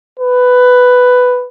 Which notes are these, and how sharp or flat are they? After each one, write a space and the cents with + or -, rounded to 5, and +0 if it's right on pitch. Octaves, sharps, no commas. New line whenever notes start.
B4 +10